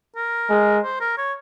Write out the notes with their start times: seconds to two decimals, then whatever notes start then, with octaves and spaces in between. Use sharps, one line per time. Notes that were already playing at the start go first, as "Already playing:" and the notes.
0.16 A#4
0.50 G#3
0.84 C5
1.00 A#4
1.18 C#5